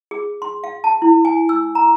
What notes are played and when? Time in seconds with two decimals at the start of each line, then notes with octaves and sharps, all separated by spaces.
0.11 G#4
0.42 C6
0.64 F5
0.84 A5
1.02 E4
1.25 G#5
1.49 E6
1.75 A#5